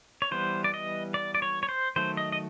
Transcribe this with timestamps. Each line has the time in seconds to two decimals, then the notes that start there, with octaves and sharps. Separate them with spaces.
0.22 C#5
0.31 E3 G3 B3 C5
0.64 D5
0.74 D#5
1.14 D5
1.35 D5
1.42 C#5
1.63 C#5
1.69 C5
1.96 D#3 F#3 A3 C5
2.17 D#5
2.32 D#5